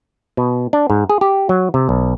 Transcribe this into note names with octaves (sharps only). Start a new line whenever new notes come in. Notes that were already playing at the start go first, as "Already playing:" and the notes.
B2
D4
G#2
G#4
G4
F#3
C3
B1